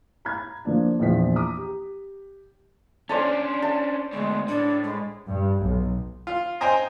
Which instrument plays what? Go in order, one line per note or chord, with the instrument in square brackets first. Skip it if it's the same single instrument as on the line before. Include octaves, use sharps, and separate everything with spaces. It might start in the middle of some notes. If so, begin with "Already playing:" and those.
[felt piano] A#5 B5 G#6
F3 A#3 D4
A#1 E2 F3 B6
A#5 D6 D#6
G4
[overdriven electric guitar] C#4 D4 [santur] C5 D5 A5
[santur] A5
[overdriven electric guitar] D2 B2 [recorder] G#3
[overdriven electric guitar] A2 [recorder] D4
[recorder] G#3
[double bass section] G2
B1
[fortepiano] F4
C5 D#5 G5 G#5 A#5 D#6